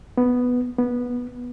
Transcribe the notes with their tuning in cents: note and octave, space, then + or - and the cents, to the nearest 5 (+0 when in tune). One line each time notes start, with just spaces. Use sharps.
B3 +0
B3 -15